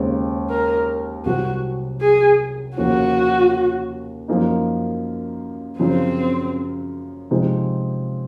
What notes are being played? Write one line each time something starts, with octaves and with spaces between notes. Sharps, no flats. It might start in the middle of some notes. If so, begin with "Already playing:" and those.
Already playing: D#2 C#3 G#3 C4 D#4
A#4
C2 C3 F#3 C4 F#4
G#4
D#2 C#3 F3 A#3 C#4 F#4
F#2 F3 A#3 D#4
F#2 C#3 F3 C4
C3 F3 G#3 C4 D#4